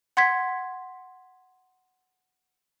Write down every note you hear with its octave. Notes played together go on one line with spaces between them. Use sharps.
F#5 C6 G#6 B6